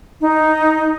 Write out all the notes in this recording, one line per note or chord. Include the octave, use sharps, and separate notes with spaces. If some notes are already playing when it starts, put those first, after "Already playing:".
D#4